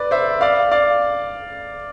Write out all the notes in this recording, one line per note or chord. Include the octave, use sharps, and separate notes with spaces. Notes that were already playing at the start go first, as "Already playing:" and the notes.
Already playing: B4 D5
C5 E5
D5 F5
D5 F5